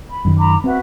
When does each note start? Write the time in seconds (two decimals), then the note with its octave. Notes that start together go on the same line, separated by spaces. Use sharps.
0.09 B5
0.25 F#2 D#3
0.37 A#5 B5 D6
0.64 C4 F#4 B4 E5